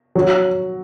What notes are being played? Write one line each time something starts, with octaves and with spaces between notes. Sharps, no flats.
F#3